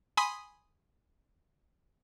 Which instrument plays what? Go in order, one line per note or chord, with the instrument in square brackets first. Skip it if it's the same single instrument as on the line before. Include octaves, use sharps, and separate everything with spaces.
[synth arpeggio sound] G#5 B5 C6 D#6 B6